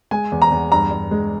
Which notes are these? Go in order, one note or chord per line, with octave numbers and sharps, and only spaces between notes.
G#3 G#5
E2
A#5
E2
G2 A#5
G2
G#3